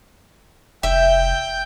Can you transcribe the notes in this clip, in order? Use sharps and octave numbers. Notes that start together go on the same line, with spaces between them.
F1 E5 G5 G6